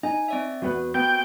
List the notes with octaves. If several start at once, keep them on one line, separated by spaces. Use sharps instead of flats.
D#4 G#5
C4 D5 E5
E2 B3 F#4 B4
B3 G5